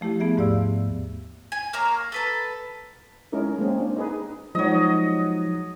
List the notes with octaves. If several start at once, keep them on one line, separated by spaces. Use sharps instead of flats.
F3 A3 E4 G4
A3 B3 G#4 E5
D#2 G#2 G4 D5 F5 E6
G#5
A#3 C#5 F5 A#5
A4 B4 A5
G#3 C#4 D#4 E4 A#4
G#3 A#3 C4 C#4
D4
D#4 G#4 B4
F3 F#3 G#3 D#4 D#5